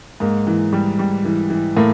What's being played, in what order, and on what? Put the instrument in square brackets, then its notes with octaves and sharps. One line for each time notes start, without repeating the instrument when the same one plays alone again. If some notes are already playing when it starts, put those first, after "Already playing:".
[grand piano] G#2 [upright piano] A#3
[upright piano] E3
G3
G3
E3
E3
[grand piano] A2 [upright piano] A#3